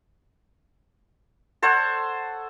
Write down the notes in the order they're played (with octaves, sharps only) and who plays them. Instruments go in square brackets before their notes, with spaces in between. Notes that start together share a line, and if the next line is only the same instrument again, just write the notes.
[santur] A4 C5 C#5 F#5